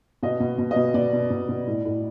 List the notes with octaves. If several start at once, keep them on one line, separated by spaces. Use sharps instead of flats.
B2 D#5
B2
B2
D#5
B2
B2 D5
B2
B2
B2
A2
A2